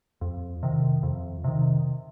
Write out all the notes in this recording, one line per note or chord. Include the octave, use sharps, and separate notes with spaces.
F2
C3 D#3
F2
C3 D#3